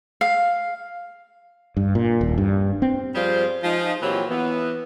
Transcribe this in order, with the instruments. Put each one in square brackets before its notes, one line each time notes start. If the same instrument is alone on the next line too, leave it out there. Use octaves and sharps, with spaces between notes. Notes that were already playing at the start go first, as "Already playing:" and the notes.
[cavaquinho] F5
[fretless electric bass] G2
A#2
D#1
G2
C4
[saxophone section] F3 G3 F4 G#4 C5 D5
F3 G#3 D#4
A#2 E3 F#3 C4 G4 C#5
E3 B3